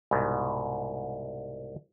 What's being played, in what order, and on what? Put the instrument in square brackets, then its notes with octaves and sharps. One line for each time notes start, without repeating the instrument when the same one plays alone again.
[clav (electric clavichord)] C2 G#2 B2